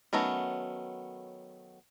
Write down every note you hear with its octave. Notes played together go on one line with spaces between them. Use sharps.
D#3 F#3 A3 B3 C#4